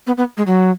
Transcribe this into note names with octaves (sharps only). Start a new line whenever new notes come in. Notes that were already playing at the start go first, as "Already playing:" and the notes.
B3
B3
G#3
F#3